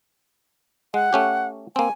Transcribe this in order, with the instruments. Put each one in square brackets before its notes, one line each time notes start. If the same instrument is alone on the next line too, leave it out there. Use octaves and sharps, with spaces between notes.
[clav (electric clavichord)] G#3 [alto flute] F#5
[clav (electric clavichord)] A3 C#4 G4
[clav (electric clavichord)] A#3 C4 [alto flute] G#5